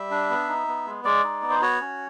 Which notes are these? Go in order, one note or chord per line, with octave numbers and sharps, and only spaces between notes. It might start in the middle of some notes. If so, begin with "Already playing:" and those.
Already playing: G3 E5
D4
B3
D#4
B3
G#3
G#3 D5
D#4
B3
C5
F#4 C#5
C#4